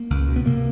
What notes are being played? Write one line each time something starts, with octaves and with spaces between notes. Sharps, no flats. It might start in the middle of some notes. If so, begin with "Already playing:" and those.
Already playing: A#3
C#2
B2
B3
C3 A#3